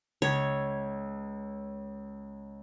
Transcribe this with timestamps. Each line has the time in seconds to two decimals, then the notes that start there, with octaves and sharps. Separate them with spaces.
0.22 C#2 C#5 G#6